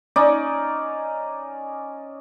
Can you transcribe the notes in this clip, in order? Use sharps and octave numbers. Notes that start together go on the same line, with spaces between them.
C#4 D#4 D5